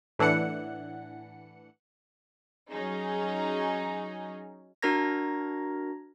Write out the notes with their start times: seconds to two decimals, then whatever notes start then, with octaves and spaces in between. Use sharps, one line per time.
0.19 A2 E3 D4 F#5 C#7
2.71 F#3 C#4 D#4 G#4
4.82 D4 F#4 A#4 A#5 G#6 A#6